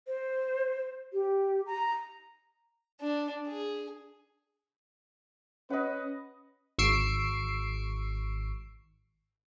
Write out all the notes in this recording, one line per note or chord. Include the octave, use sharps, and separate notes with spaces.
C5
G4
A#5
D4
G#4
C#4 B4 D#5 F#5
G#1 C#6 E6 C7 D7